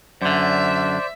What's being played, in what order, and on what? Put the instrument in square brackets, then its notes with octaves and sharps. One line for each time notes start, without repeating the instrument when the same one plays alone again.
[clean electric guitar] F#2 D3 [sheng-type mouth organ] C5 D5 [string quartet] E5